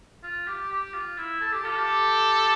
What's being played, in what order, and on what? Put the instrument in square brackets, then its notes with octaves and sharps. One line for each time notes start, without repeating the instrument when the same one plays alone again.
[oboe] F4
G4
G4
F4
E4
A4
G4
[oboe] F4 [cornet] A4
[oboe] G4